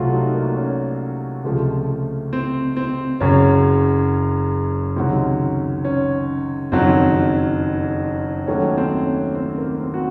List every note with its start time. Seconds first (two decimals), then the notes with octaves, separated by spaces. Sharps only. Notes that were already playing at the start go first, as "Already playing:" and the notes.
Already playing: C2 C3 F#3 A3 F4 F#4
0.13 D#4
0.34 A#3
0.57 C#4
1.45 C#2 C3 F3 A3
2.33 C4
2.77 C4
3.20 F#1 F#2 C#3 C#4
4.96 C#2 C3 D#3 F#3 C4
5.85 C#4
6.72 F#1 F2 D#3 F#3 C4
8.47 D#2 D#3 F#3 A3 C#4
8.77 C4
9.06 C#4
9.35 C4
9.58 A#3
9.80 C4
9.94 F#4